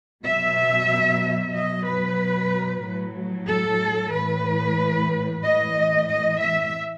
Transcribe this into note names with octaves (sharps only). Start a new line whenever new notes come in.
B2 F#3 E5
B2 F#3 D#5
B4
A2 F#3
A4
A2 E3 B4
A2 E3 D#5
D#5
E5